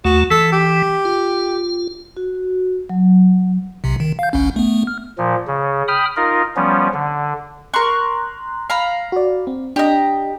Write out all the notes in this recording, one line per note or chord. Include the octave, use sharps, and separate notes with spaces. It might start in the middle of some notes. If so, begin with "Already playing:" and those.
D#2 A3 F#4
E3 A4
G4
F4
F#4
F#3
B1 C3
D#3
F5 G6
G1 C2 C#4
A3 B3
F6
A#2 F3
C#3
G5 B5 D#6 F6
D#4 F4 A#4
F3 G3 B3 C#4
D3
A#4 A#5 C6 C#6 F#6
F5 A#5 B5
F#4 D5
C4
D4 G4 D#5 A#5